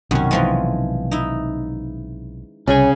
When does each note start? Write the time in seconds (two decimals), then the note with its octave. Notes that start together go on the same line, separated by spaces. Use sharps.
0.11 B1 F#2 C3 D#3 C#4
0.31 E3 F3 G#3
1.11 D#4 E4
2.68 C2 C#3 C#4 G#4 G#5